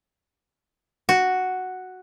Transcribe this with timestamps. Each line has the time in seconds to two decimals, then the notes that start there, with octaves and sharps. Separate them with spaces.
1.09 F#4